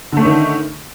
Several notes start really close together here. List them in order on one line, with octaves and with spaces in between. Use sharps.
D3 A3 C#4 D#3